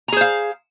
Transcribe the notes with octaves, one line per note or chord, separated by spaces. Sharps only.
G#4 C5 F5 A#5